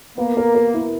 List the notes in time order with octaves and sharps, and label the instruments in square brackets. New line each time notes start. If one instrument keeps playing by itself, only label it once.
[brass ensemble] A#3 [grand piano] B3
[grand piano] A#4
A#4
E4